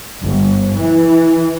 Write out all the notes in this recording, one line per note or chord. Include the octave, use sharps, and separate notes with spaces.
G1
E3